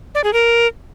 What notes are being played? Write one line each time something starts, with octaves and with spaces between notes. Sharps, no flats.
D5
G#4
A#4